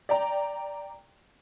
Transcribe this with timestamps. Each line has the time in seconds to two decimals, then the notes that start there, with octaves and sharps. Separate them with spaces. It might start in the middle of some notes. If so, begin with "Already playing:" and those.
0.09 D5 G5 A#5